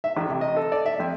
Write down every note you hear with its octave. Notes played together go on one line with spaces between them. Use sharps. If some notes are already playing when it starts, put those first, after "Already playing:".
E5
A1
C3
D#5
A4
D5
E5
F2